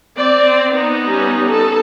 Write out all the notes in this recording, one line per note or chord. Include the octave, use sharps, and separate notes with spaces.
C4 D5
B3 D#4
G3 C#4
A4